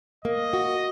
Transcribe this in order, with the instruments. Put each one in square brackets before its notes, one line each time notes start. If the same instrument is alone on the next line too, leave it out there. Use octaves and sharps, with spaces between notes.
[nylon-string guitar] A#3 [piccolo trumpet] D#5
[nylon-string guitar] F#4